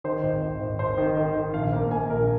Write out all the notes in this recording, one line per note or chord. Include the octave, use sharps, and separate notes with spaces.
D#3 C5
G#1
G#1
G#1
G#1 C5
D#3
D#3
D#3
A#1 F5
A#3
A#3 G#5
A#1 A#4